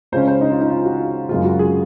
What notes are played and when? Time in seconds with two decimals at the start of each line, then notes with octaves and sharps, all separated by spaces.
0.12 C#2 C#3 G#3 C#4 C5
0.27 C5
0.41 D#4
0.52 F4
0.62 D#4
0.70 F4
0.85 F#4
1.29 F#2 C#3 G#3 C4 F4
1.45 F#4
1.59 G#4